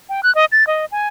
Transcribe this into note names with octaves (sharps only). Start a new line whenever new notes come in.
G5
F#6
D#5
A6
D#5
G#5